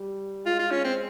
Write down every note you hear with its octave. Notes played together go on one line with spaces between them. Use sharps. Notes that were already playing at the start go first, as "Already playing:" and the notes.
Already playing: G3
G#3 F4
F4
C#4
C4